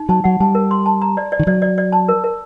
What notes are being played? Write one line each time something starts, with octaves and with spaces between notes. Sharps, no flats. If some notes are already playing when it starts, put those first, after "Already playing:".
Already playing: D#4
F#3 A5
F#3 F#5
G3 A5
A#4
C6
A5
A#5
D5
D5
D#3
F#3 D5
D5
D5
A5
A#4
A#4